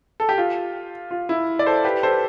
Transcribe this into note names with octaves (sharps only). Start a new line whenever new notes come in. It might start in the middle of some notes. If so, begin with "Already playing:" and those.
A4
G4
F4
F4
E4
D5
A4 C5
G4 B4
A4 C5